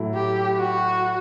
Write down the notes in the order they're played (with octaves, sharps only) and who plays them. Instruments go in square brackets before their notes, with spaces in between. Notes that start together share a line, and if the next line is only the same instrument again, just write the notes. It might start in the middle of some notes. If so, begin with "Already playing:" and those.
Already playing: [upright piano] A2 F#3 A3 E4
[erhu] G4
F#4